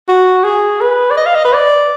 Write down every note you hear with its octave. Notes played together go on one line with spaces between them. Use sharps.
F#4
G#4
B4
D5
D#5
F5
D#5
B4
D5